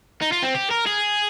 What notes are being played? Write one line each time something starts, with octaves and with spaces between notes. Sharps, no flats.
D#4
F4
C4
G4
A#4
G#4